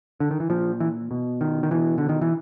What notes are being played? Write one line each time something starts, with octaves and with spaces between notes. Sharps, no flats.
D3
D#3
E3
A#2 F3
E3
B2
D#3
D#3
B2 E3
D3
D#3
E3